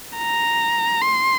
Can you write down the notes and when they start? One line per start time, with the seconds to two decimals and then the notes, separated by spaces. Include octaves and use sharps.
0.18 A#5
1.02 C6